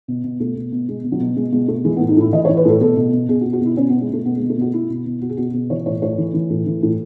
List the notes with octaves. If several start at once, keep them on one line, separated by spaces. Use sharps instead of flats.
B2
B2
B2 A3
B2
B2
B2 G#3
B2
F#3
B2
B2 G#3
B2 G#3
B2 A3
E3 G#3
B3
A2
D#4
A2 E4
E3 D#5
C#5
E3
B4
A2 A4
B2 A4
B2
B2
B2 G#4
F#4
B2
F#4
B2 E4
B2 C#4
B3
B2
G#3
B2 A3
B2 B3
G#3
B2
A3
B2 F#4
B2 E4
B2
B2
B2 F#4
G#4
B2 F#4
B2
E3 C#5
A2 C#5
A2 C#5
E3
E3
A2
E3
A2